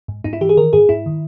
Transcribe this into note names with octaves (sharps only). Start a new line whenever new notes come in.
G#2
G#2 D#4
E4
E3 G4
G#4
D#3 A#4
G#2 G#4
G#2 E4
D#3